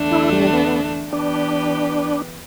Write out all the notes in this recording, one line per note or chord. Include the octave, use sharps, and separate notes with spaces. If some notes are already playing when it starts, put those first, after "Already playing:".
Already playing: E2 D3 A3 D4
E4
G3
B3
E3 B3 D4 G4 B4